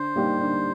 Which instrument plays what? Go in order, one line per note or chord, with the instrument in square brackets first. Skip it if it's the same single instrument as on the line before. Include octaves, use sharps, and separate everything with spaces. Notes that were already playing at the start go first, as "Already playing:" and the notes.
Already playing: [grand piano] D3 [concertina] C5
[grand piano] G3 A#3 D#4 G4
D3